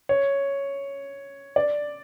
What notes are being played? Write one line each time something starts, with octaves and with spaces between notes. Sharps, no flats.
C#5
D5